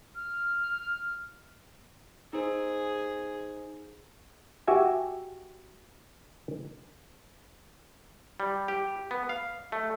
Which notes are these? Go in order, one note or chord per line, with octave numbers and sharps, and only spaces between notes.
F6
D#4 G#4 C5
F#4 G4 E5 G#5
G3
G4
B3
F5
A3